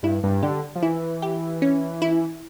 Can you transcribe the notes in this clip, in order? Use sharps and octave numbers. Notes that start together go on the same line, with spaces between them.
G2 E4
G2
D3 G4
F3
E3 E4
G4
C#4
E4